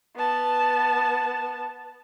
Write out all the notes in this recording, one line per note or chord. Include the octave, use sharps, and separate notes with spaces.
B3 A5